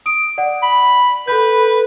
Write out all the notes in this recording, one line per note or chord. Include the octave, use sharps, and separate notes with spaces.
D#6 D7
D5 F#5
B5
A4 B4 B5 G6